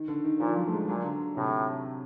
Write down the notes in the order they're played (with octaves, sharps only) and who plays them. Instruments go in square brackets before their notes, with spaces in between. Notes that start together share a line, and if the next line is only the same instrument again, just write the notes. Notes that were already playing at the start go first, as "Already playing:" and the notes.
Already playing: [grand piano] D#3
D3
D#3
[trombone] A#2 [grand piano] F3
[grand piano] F#3
A3
G#3
[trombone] A#2 [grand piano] F#3
[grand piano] D3
[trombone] A2 [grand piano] C3